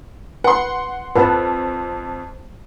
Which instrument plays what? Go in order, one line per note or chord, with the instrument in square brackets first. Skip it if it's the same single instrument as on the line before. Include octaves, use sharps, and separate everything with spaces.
[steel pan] B4 [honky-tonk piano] F#5 C6
[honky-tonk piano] F2 F3 [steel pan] B4 F#5 A5